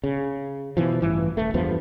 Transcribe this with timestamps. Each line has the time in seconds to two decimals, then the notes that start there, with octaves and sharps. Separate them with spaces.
0.04 C#3
0.77 B2 E3 F3
1.02 A1 G2 E3
1.37 D#1 A3
1.54 E2 G2 F3 B3